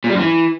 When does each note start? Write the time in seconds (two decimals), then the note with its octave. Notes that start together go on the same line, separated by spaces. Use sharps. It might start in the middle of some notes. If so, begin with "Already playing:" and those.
0.04 A#2
0.09 G3
0.14 F#2
0.20 E3